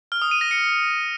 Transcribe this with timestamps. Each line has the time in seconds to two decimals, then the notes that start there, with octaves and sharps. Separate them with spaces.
0.12 F6
0.22 D#6
0.31 D#7
0.41 A#6
0.51 C#7